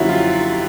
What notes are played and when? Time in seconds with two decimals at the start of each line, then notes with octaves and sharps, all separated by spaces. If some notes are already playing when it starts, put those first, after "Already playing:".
Already playing: F#2 D3 F3 A#3 C#4 E4 F#4 G4
0.09 F4